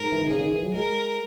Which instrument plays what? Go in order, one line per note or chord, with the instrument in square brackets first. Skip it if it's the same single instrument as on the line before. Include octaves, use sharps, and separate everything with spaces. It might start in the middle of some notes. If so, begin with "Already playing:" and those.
Already playing: [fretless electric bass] G#2 [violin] A#4
[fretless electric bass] E3
D#3
[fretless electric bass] C#3 [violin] G#4
[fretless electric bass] D#3
E3
F#3
[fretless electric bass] G#3 [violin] A#4